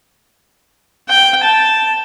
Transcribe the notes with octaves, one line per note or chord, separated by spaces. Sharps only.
G5
A5